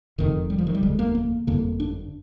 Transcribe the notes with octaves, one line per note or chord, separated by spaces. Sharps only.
F1 F2 D3 D#3
G3
F3
D#3
G3
F1 D#2 D3 G#3
A#3
A#3
G1 F2 D3 A#3
D4